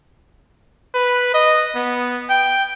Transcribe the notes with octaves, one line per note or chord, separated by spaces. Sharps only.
B4
D#5
B3
G5